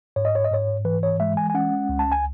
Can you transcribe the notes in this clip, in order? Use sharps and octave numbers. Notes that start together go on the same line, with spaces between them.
G#2 C#5
D#5
C#5
D#5
G#2 C#5
E3 B4
C#5
G#3 E5
G#5
G#5
C#4 F#5
C#2
A5
G#5